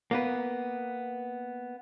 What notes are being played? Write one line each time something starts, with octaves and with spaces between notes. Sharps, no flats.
A#3 B3 B4